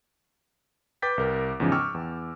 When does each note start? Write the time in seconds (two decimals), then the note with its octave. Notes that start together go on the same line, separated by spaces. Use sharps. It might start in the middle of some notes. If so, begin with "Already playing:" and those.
1.02 B4 G5 D6 G6 A6 B6
1.18 C2 A#4
1.60 E2 G#2 C#3 F3
1.72 G5 C#6 D6 E6 F6
1.94 E2